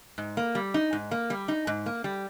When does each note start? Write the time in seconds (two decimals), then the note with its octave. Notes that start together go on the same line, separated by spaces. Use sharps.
0.18 G#2
0.37 A#3
0.55 G3
0.74 D#4
0.93 G#2
1.11 A#3
1.30 G3
1.48 D#4
1.67 G#2
1.86 A#3
2.04 G3